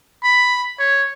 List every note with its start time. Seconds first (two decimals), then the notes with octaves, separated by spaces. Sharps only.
0.24 B5
0.79 C#5